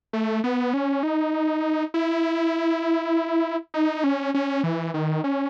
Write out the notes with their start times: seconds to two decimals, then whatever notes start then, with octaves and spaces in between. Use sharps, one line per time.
0.13 A3
0.44 B3
0.74 C#4
1.03 D#4
1.94 E4
3.74 D#4
4.04 C#4
4.34 C#4
4.64 E3
4.94 D#3
5.24 C#4